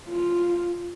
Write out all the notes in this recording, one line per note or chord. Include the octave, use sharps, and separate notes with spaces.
F4